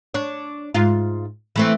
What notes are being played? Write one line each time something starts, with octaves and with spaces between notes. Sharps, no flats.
D4 C#5
G#2 F4
E3 A3 C4